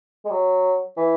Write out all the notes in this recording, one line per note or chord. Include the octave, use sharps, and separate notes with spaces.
G#3
F#3
E3